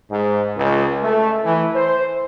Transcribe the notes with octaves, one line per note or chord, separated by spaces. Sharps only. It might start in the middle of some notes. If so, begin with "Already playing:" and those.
G#2
C#2
A3
E3
C5